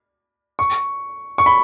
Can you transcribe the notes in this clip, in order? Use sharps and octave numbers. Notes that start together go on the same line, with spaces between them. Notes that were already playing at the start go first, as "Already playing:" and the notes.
C#6
C#6
B5